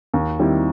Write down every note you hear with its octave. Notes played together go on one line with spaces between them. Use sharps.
D#2
D#3 G3 C4 E4